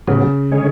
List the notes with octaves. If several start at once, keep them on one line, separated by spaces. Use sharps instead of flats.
A2 C#3 F#3 B3
D3 G#3 C#4 G#4 C#5